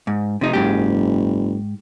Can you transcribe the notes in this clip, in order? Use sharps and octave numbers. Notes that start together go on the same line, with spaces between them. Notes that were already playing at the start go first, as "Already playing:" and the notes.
G#2
F1 C3 D#4
F#1 G#2 G4